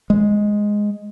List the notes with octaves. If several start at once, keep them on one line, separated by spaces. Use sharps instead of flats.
G#3